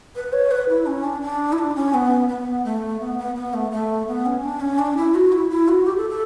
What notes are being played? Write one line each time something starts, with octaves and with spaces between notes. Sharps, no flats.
B4
C#5
B4
E4
C#4
D4
D4
E4
D4
C#4
B3
B3
A3
B3
B3
B3
A3
A3
B3
C#4
D4
C#4
D4
E4
F#4
E4
E4
F#4
G4
A4
A4